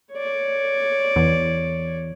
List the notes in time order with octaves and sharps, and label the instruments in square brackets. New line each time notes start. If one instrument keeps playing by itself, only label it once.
[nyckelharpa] C#5 D5
[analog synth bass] E2